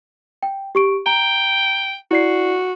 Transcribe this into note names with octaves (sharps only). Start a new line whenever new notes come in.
G5
G4 C#6 D7
G5 A#5
E4 F#4 D5 C7